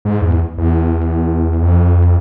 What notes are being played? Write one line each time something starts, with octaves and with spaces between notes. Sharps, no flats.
G#2
E2
E2
F2